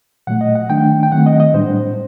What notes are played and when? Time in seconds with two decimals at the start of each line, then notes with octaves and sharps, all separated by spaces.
0.27 A#2 F#3 A3 F#5
0.41 D#5
0.55 F#5
0.69 D#3 A3 D4 G5
1.03 G5
1.12 D#3 F#3 A3 C4 F#5
1.26 D#5
1.40 D#5
1.54 A2 G3 D4 C5